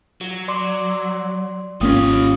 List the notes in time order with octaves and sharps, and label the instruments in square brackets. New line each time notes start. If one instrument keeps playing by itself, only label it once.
[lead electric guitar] F#3
[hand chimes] D5 C6 D6
[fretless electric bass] G#1 A#3 C#4 [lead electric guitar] F4 G4 [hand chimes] D#6